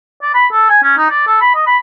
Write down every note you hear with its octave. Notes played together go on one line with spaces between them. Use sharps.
D5
B5
A4
G#5
C#4
D#4
D5
A4
B5
D#5
B5